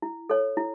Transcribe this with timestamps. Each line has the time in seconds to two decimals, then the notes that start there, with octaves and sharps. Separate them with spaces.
0.02 E4
0.30 A4 C#5
0.57 E4